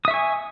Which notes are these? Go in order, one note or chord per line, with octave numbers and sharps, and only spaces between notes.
E5 G#5 C#6 D#6